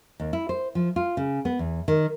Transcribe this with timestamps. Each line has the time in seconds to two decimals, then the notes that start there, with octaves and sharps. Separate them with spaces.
0.20 D#2
0.33 E4
0.49 C5
0.75 F3
0.96 F4
1.17 C#3
1.45 B3
1.59 E2
1.88 D#3